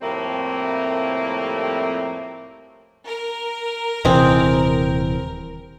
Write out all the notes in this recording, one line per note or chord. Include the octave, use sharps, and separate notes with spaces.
F2 A2 G3 A3 A#3 C4
A#4
D#1 C3 E3 G#3 C4